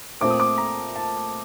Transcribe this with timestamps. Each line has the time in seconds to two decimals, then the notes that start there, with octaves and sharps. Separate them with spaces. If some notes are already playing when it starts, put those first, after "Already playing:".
0.21 A#2 A3 C4 D6
0.30 D#6
0.40 D6
0.58 A#5
0.96 A5